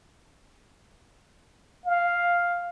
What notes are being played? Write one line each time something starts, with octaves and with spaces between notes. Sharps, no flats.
F5